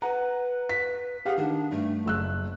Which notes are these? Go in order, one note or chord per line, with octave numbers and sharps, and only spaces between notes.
B4 F#5 A#5
B6
G4 G#4 F5 F#5
D#3 D4
G2 A3
F#1 E6 F#6